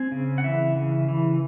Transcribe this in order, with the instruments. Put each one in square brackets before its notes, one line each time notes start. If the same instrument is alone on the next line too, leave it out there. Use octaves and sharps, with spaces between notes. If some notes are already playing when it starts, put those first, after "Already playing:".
Already playing: [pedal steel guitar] C4 G#5
C#3
F#5
E3 E5
C#3
E3